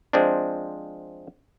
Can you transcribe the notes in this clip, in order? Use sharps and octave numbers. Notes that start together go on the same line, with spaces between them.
F3 G#3 C4 D4